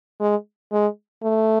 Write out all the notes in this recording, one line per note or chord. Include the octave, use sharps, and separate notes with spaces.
G#3
G#3
A3